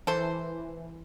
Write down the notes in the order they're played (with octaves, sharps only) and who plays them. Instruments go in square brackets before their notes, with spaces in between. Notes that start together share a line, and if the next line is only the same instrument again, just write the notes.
[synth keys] E3 [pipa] A4 C5